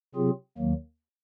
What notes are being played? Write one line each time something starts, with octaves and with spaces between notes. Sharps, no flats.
C3 F#3 C4 F4 G#4
D#2 D#3 F#3 A#3